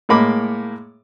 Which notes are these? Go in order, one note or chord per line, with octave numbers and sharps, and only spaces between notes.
A2 G#3 A#3 B5 D6